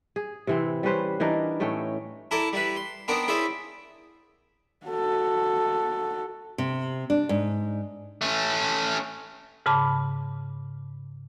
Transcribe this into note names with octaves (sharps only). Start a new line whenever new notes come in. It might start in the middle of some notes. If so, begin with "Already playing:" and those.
G#4
C3 E3 C4
G3 C#4 B4 C5
E3 D4 D#4 A#4
A2 A3 C#4 G5
E4 A4 A#4 D5 G#5 A5
G3 E4 B4
C6
B3 C4 D4 D#4 A#4
C#4 E4 G#4 C5 D5 E5
F#4 A4
C3
D4
G#2
A3 C#4
G#2 C#3 A5 B5 D6